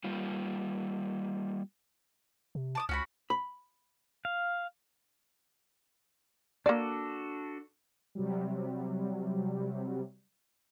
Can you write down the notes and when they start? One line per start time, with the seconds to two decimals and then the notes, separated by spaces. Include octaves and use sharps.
0.04 G3 A#3 F4
2.55 C3
2.75 A5 D6 D#6
2.89 C#2 C#4 F#4 B5
3.30 B5
4.25 F5
6.66 A#3 D4 F#4 A4 D5
8.15 C3 F#3 G3